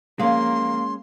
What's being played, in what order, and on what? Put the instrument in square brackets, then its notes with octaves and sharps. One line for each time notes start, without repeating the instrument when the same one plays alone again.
[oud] F3 F5 [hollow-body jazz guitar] G#3 C#4 [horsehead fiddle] A#3 [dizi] C6